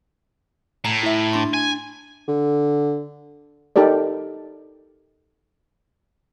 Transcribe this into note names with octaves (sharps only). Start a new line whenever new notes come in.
A2 A#5
E4 E5
D4 C6
G#5
D3
D#4 G4 A4 A#4 D5